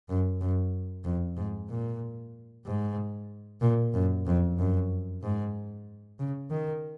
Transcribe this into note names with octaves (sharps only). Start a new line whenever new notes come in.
F#2
F#2
F2
G#2
A#2
G#2
A#2
F#2
F2
F#2
G#2
C#3
D#3